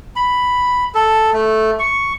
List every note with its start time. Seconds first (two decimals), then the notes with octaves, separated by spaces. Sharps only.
0.16 B5
0.95 A4
1.33 A3
1.79 C#6